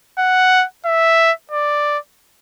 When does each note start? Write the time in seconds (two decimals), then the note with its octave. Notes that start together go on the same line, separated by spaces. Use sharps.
0.18 F#5
0.85 E5
1.51 D5